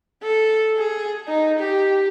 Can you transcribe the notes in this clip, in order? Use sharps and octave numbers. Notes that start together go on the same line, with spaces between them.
A4
G#4
D#4
G4